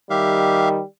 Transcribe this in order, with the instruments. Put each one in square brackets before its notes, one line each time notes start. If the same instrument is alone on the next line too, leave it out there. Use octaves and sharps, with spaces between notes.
[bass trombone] D#3 [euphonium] G3 [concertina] G4 E5 F5